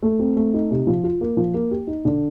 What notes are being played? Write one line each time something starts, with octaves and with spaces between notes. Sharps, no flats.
A3
C4
A3
D#4
C3
F3
F4
A#3
F3
A#3
G4
D#4
D3